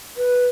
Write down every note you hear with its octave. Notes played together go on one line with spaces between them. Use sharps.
B4